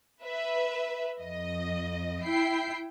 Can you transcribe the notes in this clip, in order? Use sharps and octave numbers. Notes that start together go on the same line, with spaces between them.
B4 E5
F2 D#5
E4 G5 C7